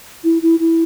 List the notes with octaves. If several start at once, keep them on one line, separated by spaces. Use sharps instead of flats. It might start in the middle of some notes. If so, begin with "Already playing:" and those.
E4
E4
E4